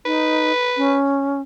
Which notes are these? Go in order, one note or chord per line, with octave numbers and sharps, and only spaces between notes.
D#4 B4
C#4